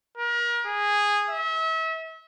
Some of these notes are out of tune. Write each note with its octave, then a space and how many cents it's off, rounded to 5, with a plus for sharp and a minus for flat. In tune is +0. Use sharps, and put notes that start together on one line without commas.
A#4 +35
G#4 -10
E5 -35